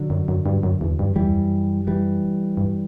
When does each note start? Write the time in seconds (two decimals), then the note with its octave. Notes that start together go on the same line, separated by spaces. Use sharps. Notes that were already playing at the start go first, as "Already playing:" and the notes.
Already playing: D3 F#3
0.10 F#2
0.28 F#2
0.46 G2
0.63 F#2
0.81 E2
0.99 G2
1.10 F#2
1.16 E3 G3
1.21 E2
1.32 F#2
1.87 E3 G3
2.57 G2